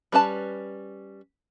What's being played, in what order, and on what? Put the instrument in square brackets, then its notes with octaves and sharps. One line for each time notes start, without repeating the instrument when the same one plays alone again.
[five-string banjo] G3 C#4 B4 F5 A5